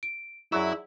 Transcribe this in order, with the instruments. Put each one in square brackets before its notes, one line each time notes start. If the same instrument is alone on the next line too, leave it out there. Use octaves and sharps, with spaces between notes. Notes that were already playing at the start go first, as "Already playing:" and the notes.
[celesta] D7
[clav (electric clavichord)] F#2 F#3 [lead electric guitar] E4 [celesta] G#4 D5 E6